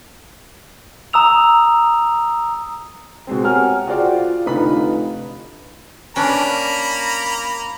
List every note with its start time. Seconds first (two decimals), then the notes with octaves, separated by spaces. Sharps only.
1.13 A#5 D#6 E6 F7
3.27 B2 G#3 C4
3.43 G4 A#4 C#5 F#5 G#5 F6
3.87 F4 F#4 G#4 C5 D5 G5
4.13 F4
4.45 F1 D3 D#4 F4 B4 B5
6.16 A#3 C#4 D4 A#5 B5